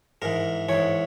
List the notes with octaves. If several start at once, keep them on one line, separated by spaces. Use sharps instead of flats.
G#2 E3 A#4
G#2 E3 C#5